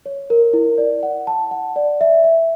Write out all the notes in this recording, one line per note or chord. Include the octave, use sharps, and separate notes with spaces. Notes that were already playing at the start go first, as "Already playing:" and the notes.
C#5
A#4
E4
D5
F#5
A5
F#5
D5
E5
E5